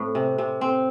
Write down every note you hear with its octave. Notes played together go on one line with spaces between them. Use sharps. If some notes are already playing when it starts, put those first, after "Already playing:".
Already playing: A2 C4
C3
C3
C4